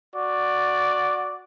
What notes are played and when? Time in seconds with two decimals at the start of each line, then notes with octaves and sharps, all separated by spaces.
0.14 F#4 D5